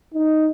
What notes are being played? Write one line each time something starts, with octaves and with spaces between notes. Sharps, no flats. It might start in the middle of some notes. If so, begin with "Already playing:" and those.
D#4